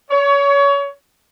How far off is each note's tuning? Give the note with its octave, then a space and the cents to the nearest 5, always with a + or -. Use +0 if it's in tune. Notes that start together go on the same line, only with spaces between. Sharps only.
C#5 +25